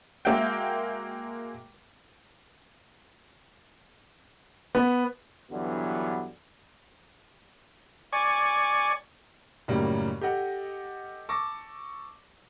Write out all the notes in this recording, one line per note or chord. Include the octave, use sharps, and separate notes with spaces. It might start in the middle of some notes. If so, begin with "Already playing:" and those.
G#3 A#3 F#4 E5 F5 G5
B3
G2 D3 E3 F#3 B3
D5 G#5 C#6
F#2 A2 C#3 G3 A#3 D#4
G4 A4 D#5 F#5
A5 C#6 D6 E6 A#6